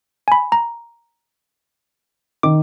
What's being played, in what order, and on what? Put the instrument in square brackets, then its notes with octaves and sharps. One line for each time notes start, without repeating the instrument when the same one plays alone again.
[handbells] G#5 B5
A#5
[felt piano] D#3 [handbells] D6